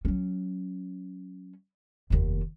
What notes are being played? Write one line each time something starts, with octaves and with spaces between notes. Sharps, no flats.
F#3 C#4
F1 D#2